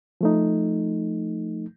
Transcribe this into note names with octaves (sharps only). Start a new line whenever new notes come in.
F3 A3 D#4